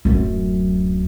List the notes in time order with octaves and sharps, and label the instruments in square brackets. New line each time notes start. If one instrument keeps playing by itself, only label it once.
[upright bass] D1 F#2